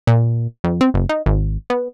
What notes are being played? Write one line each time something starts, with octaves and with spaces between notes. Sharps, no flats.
A#2
F2
C4
F#1
D#4
G#1
B3